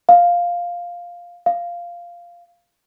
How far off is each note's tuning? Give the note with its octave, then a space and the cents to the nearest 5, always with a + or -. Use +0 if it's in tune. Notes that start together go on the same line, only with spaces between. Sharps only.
F5 +5
F5 -5